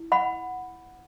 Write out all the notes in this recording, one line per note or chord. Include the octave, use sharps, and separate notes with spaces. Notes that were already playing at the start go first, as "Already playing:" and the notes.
Already playing: E4
F#5 B5